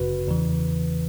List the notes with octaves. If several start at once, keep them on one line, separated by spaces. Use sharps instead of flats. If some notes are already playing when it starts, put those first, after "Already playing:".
Already playing: G1 F#2 C#3 F#4 B4
E2 C#3 E3